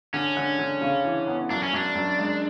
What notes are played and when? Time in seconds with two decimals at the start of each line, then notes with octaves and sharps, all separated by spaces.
0.13 D3 C#4
0.37 D3
0.59 D3
0.82 C#3
1.05 E3
1.27 B3
1.50 F#2 D4
1.63 C#4
1.73 F#2 D4
1.95 F#2
2.18 G#3